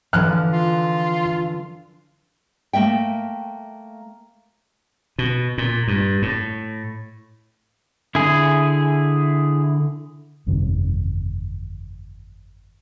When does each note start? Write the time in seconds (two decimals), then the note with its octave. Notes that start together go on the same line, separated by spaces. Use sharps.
0.13 D3 E3 F3 F6 F#6
0.52 F4
2.73 A3 A#3 E5 G5
5.18 B2
5.58 A#2
5.88 G2
6.22 A2
8.15 D3 E4 G#4
10.46 G1 F2 C3 D#3